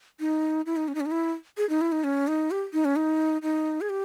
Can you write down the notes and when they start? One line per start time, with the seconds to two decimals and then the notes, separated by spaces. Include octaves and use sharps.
0.20 D#4
0.66 E4
0.77 D#4
0.88 C#4
0.95 D#4
1.00 C#4
1.06 D#4
1.11 E4
1.57 G#4
1.69 D#4
1.81 E4
1.92 D#4
2.04 C#4
2.28 D#4
2.51 G4
2.73 D#4
2.85 C#4
2.96 D#4
3.42 D#4
3.81 G#4
3.90 G4